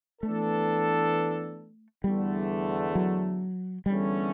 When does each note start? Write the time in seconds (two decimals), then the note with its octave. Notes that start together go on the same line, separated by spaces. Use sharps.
0.22 E3 A3 B3 D4 A4
2.04 E2 D3 G3 A3
2.95 F#3
3.86 E2 D3 G3 A3 C#4